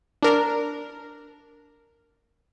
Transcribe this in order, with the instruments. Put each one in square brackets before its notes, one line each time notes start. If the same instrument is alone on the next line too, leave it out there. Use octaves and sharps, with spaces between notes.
[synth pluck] D4 A#4